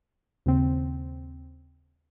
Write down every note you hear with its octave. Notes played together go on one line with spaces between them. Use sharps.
D#2 C#3 C4